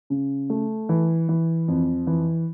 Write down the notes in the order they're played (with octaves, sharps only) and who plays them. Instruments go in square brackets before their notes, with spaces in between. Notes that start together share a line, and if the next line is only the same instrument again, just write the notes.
[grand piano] C#3
A3
E3
E3
F2
E3